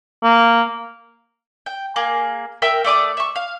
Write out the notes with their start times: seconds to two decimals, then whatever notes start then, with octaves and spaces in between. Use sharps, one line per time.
0.23 A#3
1.66 G5
1.96 A#3 G#4
2.62 A#4 E5 G5 E6
2.84 A3 D5 D6 D#6
3.17 E5 C#6
3.36 F5